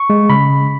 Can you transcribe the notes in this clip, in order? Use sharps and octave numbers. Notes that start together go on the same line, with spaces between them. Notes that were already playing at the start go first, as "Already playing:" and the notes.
Already playing: C#6
G#3
C#3 B5